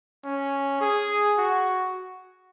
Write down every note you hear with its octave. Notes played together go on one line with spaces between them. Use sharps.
C#4
G#4
F#4